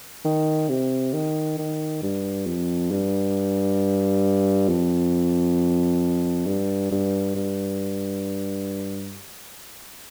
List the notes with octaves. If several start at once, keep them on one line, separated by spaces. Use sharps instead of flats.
D#3
C3
D#3
D#3
G2
F2
G2
F2
G2
G2
G2